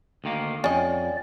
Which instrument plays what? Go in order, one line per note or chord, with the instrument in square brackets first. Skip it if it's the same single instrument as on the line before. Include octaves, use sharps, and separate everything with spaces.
[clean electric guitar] D2 D#3 A#3
[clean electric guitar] F2 [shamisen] C#4 D#5 [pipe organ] D5 [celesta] G5 G#5